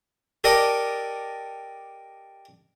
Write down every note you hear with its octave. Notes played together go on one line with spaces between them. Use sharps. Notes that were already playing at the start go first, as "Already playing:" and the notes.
G4 A4 A#4 D5 D#5